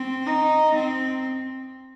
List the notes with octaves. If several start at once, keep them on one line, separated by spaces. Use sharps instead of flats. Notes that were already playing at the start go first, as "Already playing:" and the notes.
Already playing: C4
D#4
C4